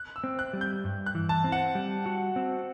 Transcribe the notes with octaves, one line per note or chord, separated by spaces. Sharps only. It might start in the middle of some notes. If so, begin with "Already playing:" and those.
Already playing: F#6
E6
C4
F#6
G3
G6
G2
F#6
E3
A5
C4
F#5
G3
F#4
C4